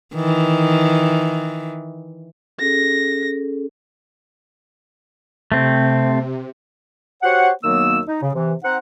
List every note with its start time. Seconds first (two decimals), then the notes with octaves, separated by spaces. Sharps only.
0.15 D#3 E3
2.60 C#4 G#4 A4 A#6
5.52 C3 A3 C4
7.23 F#4 G4 C5 C#5 F#5
7.63 F#2 D#3 F#3 A#3 B3 E6
8.08 D#4
8.22 C#3
8.34 C3 E3
8.64 C4 D#4 F#5